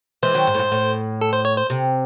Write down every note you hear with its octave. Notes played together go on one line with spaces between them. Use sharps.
E3 G#3 C5
D#3 F#3
G#2
A2
G#2
A2
A4
C5
C#5
C5
C3